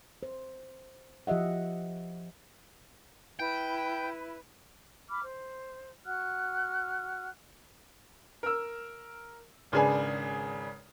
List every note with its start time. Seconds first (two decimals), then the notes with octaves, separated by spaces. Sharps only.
0.23 C5
1.27 F3 G4 D#5 E5 F#5
3.40 E4 B4 G5
5.09 B5 D6 F6
5.23 C5
6.05 F#4 F#5 F6 F#6
8.43 A#4 E6
9.72 G#1 C#3 D4 G#4 B4 G#5